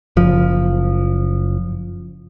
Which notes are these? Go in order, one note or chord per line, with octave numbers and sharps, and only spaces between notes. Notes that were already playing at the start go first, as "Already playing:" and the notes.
F#1 F3